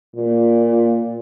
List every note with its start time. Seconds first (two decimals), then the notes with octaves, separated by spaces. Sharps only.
0.16 A#2